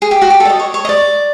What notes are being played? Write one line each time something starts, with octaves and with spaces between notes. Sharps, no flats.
G#4
G4
F#4
G4
A4
D5
D#5
C#5
C#5
D#5
D5